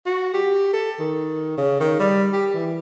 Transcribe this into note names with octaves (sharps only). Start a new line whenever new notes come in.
F#4
G4
A4
D#3
C#3
D#3
G3
G4
E3